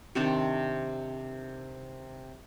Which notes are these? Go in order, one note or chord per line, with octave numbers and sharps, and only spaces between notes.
C3 D#3 C4 D4